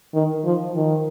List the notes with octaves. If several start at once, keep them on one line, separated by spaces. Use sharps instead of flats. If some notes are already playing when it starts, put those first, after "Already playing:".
D#3
F3
D#3